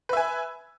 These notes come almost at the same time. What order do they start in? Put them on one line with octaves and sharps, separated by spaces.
B4 E5 G#5